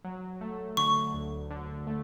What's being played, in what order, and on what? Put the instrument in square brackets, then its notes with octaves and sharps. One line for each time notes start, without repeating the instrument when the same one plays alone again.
[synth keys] F#3
A3
[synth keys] D3 [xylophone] C#6
[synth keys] D2
D3
A3